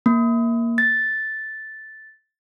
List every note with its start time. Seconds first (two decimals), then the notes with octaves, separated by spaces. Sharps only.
0.06 A#3
0.78 A6